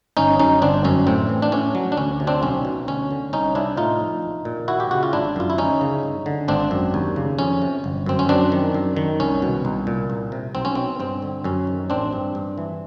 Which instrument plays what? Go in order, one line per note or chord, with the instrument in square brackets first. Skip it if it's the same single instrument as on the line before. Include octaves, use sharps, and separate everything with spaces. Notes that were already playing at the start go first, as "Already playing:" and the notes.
[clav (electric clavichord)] G1 C#4 D#4
F#2 C#4 D#4
G1 C4 D4
F#2 C#4
A2 C4
E3
D4
A2 C#4
F#3
D4
D2 C#4
C3
C4 D4
B1 C#4
B2
D2 C#4
D3
C2 C#4 D#4
C3 D4 E4
A2 D#4 F4
F3
A#1
A#2
D#2 E4 F#4
G4
C#3 F#4
F4
G#1 D4 E4
F#2 F4
E4
D2 C#4 D#4
C#3
G2
D3
G#1 C4 D4
F#2
D#2
C#3
F2 C#4
C3
G1
F#2 C4
C#4
F#2 C4 D4
D#3
F#2
D#3
C2 C#4
B2
C2
A#2
C2
C3
B1 C4
C#4
B2 C4
G2 C4
D3
F#2 C#4
D#3
A1 C4 D4
G2
G2
E3